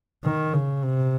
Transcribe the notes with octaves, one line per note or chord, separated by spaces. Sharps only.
D#3
C#3
C3